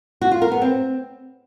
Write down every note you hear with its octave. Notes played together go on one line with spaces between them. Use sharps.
F#4
F4
A#4
B3
C4